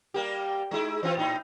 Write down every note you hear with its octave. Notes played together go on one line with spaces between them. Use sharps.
G3 A#3 G4
G#3 D#4 E4
E3 C4 F4
A2 D#4 E4